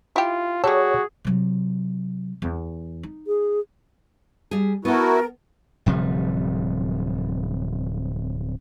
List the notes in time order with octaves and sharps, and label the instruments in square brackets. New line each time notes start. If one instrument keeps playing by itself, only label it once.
[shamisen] E4 G4 [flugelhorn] F4
[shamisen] G3 A4 [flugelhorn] F#4 [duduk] G#4 [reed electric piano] C#5
[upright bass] C3 F#3
E2
D#4
[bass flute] G#4
[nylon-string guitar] G3 G#4
[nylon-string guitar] B3 A4 [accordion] E4 F#4 [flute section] A#4
[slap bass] D1 C3 F3 G3